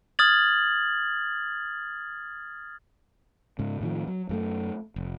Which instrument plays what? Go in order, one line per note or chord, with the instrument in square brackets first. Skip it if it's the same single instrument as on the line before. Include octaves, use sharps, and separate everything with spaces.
[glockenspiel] D#6 F6 G#6 A6 F#7
[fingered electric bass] G#2 C#3
A2 D#3 F3
F#3
F#2 G#3 A3
F1